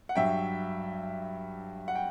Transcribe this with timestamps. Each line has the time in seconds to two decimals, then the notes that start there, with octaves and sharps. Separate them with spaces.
0.09 F#5
0.15 G2 F#3 E5 G5
1.88 F#5
1.95 G5